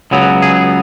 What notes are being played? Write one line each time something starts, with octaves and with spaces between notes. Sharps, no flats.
C#2 C#3 F#3 B3
G#4